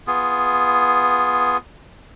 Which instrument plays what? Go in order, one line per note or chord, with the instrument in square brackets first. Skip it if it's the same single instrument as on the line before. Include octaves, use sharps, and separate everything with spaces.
[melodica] B3 F4 G#4